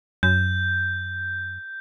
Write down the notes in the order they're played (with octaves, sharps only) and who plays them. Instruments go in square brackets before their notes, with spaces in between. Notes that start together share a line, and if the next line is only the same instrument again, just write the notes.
[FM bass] F#2 [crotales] G6